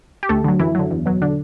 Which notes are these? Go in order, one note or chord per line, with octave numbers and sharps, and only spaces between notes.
G4
D2 A3 A4
D3 F#3
F#2 E3 E4
D3 F#3
E2
B2 F#3
D3 D4